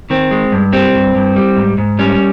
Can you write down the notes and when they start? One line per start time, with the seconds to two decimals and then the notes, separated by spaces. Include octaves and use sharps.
0.10 D#3 C4
0.31 G#3
0.52 G2
0.73 G3 C4
0.94 G2
1.15 G2
1.36 G3
1.57 G#2
1.78 G#2
1.99 G3 C#4